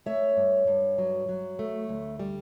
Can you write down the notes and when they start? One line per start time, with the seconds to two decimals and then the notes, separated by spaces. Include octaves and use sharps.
0.06 A3 C#5 E5
0.37 G2
0.67 G2
0.98 F#3
1.29 F#3
1.59 A3
1.89 D2
2.19 G3